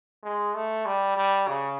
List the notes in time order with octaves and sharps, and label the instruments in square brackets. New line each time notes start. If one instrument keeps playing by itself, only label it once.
[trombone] G#3
A3
G3
G3
C#3